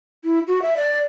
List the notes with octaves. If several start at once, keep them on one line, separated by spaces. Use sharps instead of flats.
E4
F#4
E5
D5